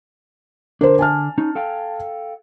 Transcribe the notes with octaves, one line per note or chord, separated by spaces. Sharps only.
D3 D4 A#4 C5
G#5 A5 F6
C#4 D#4
A4 F5 G5